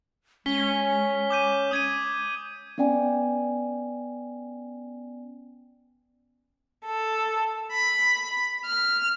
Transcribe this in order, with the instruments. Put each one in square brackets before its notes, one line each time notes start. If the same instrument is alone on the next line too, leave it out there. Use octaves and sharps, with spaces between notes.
[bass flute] G#3 [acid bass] C#4 [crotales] B6 G7
[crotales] D6 G6 D#7
D#6 G#6 D#7
[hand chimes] B3 C#4 D5 G5 G#5
[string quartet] A4
B5
F6